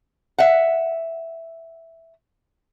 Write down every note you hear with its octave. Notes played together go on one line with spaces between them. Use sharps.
E5 F#5